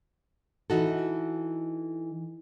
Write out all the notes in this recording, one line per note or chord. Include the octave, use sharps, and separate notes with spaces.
E3 D#4 F#4 A4